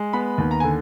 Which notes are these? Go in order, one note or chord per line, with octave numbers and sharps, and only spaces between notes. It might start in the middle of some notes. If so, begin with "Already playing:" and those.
Already playing: G#3
B3 B5
D#2
A#5
D3 G#5